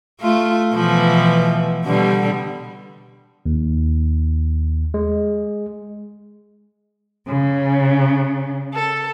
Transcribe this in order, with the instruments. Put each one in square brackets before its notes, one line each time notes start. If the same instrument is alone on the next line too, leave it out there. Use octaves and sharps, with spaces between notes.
[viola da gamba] A3 F4
B2 E3 F3
B2 D3 G3
[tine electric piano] D#2
G#3
[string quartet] C#3
A4